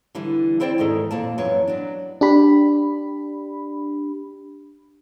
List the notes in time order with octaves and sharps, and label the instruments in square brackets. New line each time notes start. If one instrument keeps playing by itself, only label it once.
[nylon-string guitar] D3 E3 G3
C4 E4 C5 D5 G5
E2 G#2 D#3 D#4 A4
F2 A#2 A5
F#2 E3 B3 C#5
F#3 D4
[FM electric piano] D4 G4 B5